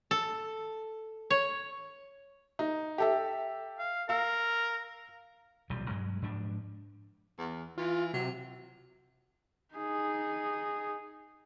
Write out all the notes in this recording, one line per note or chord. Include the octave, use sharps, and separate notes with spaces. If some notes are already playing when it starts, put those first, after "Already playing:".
A4
C#5
D#4
G4 A4 E5
F5
A#4 F5 E6
D#1 B1 F3 G3
G2 F#3 G#3
G#2 F3 D4
E2
E3 F4
C3 F#3
D#4 G#4